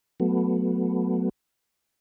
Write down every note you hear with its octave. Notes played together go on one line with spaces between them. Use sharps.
F#3 A3 B3